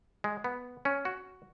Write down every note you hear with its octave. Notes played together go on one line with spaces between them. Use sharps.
G#3
B3
C#4
F#4